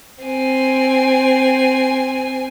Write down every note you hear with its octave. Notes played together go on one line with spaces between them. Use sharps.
C4 G#5